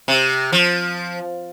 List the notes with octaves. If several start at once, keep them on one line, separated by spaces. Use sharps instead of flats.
C3
F3